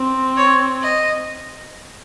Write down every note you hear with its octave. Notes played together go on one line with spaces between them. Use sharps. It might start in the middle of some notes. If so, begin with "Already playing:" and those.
Already playing: C4
C#5
D#5